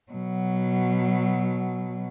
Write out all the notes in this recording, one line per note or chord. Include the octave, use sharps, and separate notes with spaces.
B2 F#3